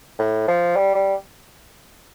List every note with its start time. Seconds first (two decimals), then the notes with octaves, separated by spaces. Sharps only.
0.19 A2
0.48 F3
0.76 G3
0.95 G3